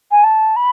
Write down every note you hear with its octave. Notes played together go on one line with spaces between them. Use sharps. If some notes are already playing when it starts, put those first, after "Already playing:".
G#5
A5
B5